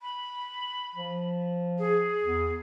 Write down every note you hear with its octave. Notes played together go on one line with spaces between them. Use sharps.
B5
F3
G#4
E2